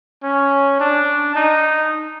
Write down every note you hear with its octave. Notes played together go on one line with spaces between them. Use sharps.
C#4
D4
D#4